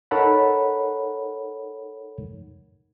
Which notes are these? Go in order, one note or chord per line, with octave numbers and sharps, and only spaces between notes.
D#4 A4 A#4 C#5 F#5 B5